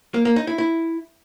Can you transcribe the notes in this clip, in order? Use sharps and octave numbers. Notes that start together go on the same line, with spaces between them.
A#3
A#3
D#4
E4
E4